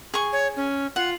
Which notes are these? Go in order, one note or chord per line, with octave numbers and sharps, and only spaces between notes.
G#4 C#6
C#5
C#4
F4 F#5